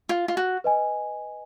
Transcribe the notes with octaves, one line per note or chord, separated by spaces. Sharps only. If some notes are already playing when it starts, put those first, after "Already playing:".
F4
F4
F#4
B4 D#5 G#5